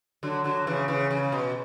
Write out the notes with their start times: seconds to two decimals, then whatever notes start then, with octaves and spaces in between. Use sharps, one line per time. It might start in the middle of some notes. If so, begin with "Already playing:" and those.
0.23 D3 F#3
0.44 D3 F#3
0.67 C#3 E3
0.88 C#3 E3
1.11 C#3
1.32 B2